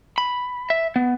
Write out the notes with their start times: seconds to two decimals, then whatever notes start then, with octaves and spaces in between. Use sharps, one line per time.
0.18 B5
0.70 E5
0.96 B3